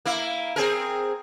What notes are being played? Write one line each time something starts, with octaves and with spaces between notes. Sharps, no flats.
A#3 E4
C4 G#4 A#4